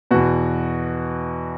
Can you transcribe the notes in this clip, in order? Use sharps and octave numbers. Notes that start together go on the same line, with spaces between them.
E2 B2 F#4